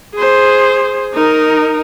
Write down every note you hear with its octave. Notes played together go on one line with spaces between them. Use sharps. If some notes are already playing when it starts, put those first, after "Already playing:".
G#4 C5
D#4 A#4